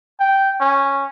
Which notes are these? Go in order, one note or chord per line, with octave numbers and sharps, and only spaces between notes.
G5
C#4